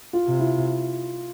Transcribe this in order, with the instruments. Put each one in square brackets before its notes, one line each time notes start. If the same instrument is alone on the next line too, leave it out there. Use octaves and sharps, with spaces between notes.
[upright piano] F4
[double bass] C3
[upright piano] E4